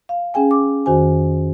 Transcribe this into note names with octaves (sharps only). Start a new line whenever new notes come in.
F5
C#4 G#4 G5 G#5
D6
F2 D#3 F#4 C5 G#5